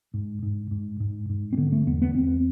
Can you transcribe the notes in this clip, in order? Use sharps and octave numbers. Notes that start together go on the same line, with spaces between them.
G#2
G#2
G#2
G#2
G#2
C4
D3 B3
A3
E2 B3
B3
E2 C4